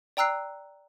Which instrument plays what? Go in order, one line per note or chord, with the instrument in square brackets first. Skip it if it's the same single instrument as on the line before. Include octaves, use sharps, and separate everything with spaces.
[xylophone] D5 G5 A#5 E6 F#6 C7